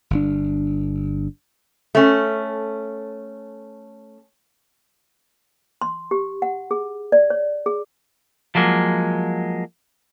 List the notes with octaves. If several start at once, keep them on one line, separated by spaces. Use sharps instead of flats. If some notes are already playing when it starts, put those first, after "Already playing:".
G1 D4
A3 C#4
C6
G4
F#5
G#4
D5
C#5
G#4
F3 F#3 G#3 A#3